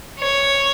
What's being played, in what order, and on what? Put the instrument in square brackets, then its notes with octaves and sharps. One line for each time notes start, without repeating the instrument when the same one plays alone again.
[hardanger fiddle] C#5